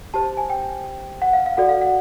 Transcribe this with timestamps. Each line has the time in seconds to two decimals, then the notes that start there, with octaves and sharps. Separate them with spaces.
0.14 G4 C5 A5
0.37 G#5
0.50 G5
1.22 F#5
1.33 F5
1.46 F5
1.57 F#4 A4 D5 F#5
1.69 F5
1.81 F#5